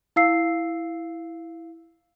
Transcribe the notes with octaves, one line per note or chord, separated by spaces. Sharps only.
E4 F5 E6 C7